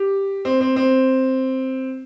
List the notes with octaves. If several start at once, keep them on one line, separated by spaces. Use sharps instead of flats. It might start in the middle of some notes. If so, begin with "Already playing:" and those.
Already playing: G4
C4
C4
C4